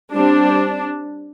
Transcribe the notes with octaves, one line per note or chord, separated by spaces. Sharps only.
G3 C4 D4